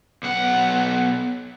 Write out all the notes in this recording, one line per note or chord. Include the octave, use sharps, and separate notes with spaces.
B1 F#5